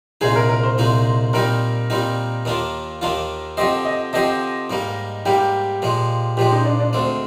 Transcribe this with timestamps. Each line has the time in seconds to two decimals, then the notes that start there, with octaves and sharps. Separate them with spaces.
0.21 C2 A#2 G#3 D#4 G#4
0.36 A#4
0.49 A#4
0.63 C5
0.78 C2 A#2 G#3 D#4
1.33 A#2 G3 C4 D#4 A#4
1.90 A#2 G3 C4 D#4
2.45 D#2 D#3 A#3 D4 F4
3.01 D#2 D#3 A#3 D4 F4
3.57 D3 F3 C4 G4 C5 D#5
3.85 D#5
4.13 D3 F3 C4 G4 C5 D#5
4.70 G#2 G3 A#3
5.26 G#2 G3 A#3 G4
5.82 A#2 F3 G#3
6.37 A#2 F3 G#3 G4
6.52 D#4
6.65 D4
6.80 D4
6.93 D2 D3 G#3 C4